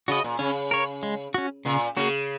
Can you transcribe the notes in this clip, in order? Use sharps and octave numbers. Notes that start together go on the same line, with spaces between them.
C#3 F#4 D#5
A#2
C#3 C#4
A#4 C#5
G#3
C#4 F#4
A#2 C#3
C#3 A#3 F#4